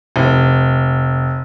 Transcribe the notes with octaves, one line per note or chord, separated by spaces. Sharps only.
F1